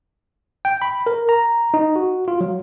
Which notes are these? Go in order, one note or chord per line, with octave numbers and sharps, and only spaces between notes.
G5
B5
A#4
A#5
D#4
F#4
F4
F#3